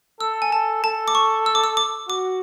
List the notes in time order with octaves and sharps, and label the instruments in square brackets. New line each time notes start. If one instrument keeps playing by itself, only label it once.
[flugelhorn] A4 [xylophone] E6
[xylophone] G#5
[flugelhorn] A4 [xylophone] A5
[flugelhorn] A4 [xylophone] A5
[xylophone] D6
C#6
E6
D6
E6
D6
[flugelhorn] F#4 [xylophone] D6